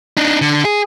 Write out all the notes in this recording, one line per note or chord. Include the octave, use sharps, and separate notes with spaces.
D4 D#4
D3
G#4